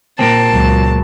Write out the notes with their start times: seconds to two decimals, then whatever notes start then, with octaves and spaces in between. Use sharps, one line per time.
0.19 A#2 A#3 C4 A5
0.50 C#2 F#3